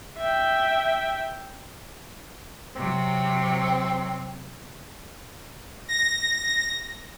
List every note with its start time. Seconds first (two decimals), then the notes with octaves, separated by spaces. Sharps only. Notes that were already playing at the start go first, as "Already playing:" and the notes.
0.18 E5 G5
2.76 C3 F#3 C4
5.88 A#6